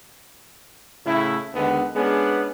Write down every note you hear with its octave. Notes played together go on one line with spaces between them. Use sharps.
A2 C#3 A3 E4
D#2 D3 G#3 B3
G#3 B3 C#4 D4 G#4